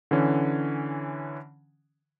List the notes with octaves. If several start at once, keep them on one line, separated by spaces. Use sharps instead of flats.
D3 E3 C#4